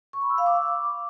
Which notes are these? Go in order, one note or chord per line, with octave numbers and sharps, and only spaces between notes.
C#6
B5
E6
F5
D6